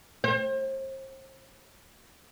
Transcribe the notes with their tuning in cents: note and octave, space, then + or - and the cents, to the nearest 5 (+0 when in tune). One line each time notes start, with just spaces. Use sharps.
C5 +35